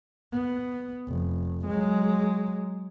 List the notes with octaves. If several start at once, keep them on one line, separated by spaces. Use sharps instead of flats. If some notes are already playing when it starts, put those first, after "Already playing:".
B3
F1
F#3 G#3